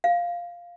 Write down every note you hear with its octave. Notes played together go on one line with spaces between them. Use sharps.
F5